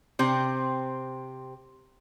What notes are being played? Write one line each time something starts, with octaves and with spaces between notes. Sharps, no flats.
C3 C4